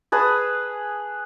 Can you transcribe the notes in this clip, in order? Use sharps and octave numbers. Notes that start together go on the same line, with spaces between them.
G#4 B4 A5 D#6